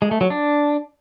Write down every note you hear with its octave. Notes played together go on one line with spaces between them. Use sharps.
G#3
A3
F#3
D4